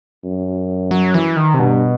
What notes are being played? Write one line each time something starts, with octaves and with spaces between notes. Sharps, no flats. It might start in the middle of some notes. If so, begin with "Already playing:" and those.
F#2
F#3
E3
D#3
C3
G2 B2